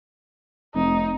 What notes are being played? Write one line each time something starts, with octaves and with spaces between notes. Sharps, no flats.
F1 D#4